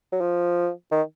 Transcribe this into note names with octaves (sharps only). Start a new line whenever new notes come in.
F#3
F3
D#3